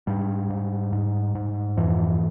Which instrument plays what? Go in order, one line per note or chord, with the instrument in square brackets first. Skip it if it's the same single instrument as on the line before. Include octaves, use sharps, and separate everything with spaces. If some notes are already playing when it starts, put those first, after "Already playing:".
[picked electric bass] G#2 G3
G#2
G#2
G#2
F2 E3